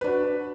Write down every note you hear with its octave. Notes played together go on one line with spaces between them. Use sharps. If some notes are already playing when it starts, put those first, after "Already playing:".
D4 F#4 B4